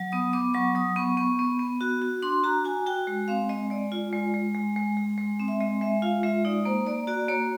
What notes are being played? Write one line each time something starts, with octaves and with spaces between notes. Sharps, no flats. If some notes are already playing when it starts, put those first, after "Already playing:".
Already playing: F#3
B3 D#6
B3 D6
F#3 C#6
F#3 D#6
B3 C#6
B3 C#6
B3
B3
F#4
F#4
D4 C6
F#4 A#5
F#4 G#5
F#4 G5
G#3
C4 F5
G#3 D#5
G#3 D5
F4
G#3
G#3
G#3
G#3
G#3
G#3
C4
E5
G#3 D#5
G#3 E5
F4 F5
G#3 E5
D#4 D5
A#3 C5
A#3 D5
F#4 D5
A#3 C#5